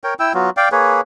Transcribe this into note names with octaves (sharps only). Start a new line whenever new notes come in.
A#4 C#5 G5
E4 G5 E6
F#3 B3 F4 F#4
D5 F5 G5
A#3 G#4 B4 C#5